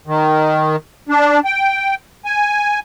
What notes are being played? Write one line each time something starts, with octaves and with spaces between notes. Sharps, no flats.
D#3
D4
G5
G#5